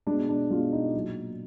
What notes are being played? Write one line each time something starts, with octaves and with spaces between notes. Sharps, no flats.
B2 G#3 D4
D4
B2 G#3 F4
D#4
A#2 F#3